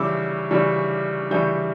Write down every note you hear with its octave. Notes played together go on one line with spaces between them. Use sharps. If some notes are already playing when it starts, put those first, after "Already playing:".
Already playing: C#3 E3 G3 D6 E6
C#3 E3 G3
C#3 E3 G3 G6